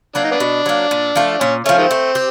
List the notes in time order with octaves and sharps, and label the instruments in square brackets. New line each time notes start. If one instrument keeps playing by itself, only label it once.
[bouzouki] F#3 A#3 [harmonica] D4
[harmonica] D#4
B3 D4
[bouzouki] B2
F#3 A#3
A#2
F3 A3
[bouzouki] A#2 [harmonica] C#4
[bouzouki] F3 A3 [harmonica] C#4
[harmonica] D#3 G#3 C4
[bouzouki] A3
G4